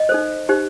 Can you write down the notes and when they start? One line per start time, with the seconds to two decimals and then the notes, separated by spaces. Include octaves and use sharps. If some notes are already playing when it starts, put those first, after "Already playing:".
Already playing: D#5
0.09 D#4 A4 C5
0.49 D#4 G4 C5